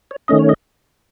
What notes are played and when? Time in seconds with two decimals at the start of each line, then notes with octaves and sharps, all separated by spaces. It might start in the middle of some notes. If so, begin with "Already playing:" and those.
0.11 C#5
0.28 D#3 A3 C#4 D#5
0.39 C#5
0.49 D#5